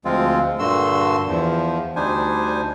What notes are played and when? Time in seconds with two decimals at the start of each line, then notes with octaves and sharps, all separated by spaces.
0.05 D2 F3 G#3 C4 F4
0.59 G2 A#2 D3 F#4 C6 E6
1.28 E2 F3
1.96 D2 G3 D4 D#4 C5 G#5